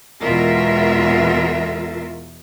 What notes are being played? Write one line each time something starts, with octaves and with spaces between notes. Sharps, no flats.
E2 B2 G#3 F4 A#4 E5